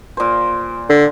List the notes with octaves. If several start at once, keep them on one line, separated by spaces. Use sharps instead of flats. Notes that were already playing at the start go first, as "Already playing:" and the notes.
A#2 C5
D3